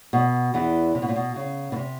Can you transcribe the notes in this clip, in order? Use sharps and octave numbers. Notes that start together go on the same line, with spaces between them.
B2
E2 E3
C3
B2
A#2
B2
C#3
B2
C3